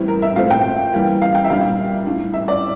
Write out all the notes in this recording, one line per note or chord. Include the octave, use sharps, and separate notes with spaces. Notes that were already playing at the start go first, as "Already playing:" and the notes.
Already playing: A2 E3 G3 C4 E4
A#4
E5
A#2 A3 C4 F5
G5
E3 G3 A#3
F5
G5
E5
A#2 G3 A#3 D4 F5
A2 G3 D4
E5
D5